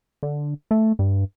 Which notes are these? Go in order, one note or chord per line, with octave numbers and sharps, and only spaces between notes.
D3
A3
G2